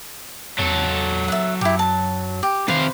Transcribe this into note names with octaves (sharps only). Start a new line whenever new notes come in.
E2 F#3 A4
E5 F#5
F#2 E4 G4
A5
G4
C3 D#3 B4 C5 F5